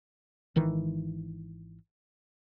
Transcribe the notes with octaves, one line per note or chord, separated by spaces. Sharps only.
G#1 D#3 E3